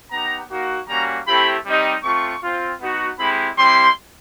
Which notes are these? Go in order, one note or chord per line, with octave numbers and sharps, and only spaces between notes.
B3 D#4 G4 A#5
A#3 D#4 F#4
G3 A#3 C#4 F#4 A#5
A3 C4 E4 G4 B5
G3 C4 D#4 G4
A3 C4 F4 C#6
C4 F4
B3 D#4 F#4
G#3 C4 E4 G4 B5
G3 C4 E4 G4 C6